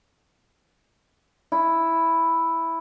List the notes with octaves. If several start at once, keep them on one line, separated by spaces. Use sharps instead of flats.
E4